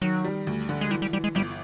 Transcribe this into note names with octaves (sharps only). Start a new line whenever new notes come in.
D#3 F#3
G3
D2
D3
G#3
E3 G3
G3
E3 G3
G#3
G1 G3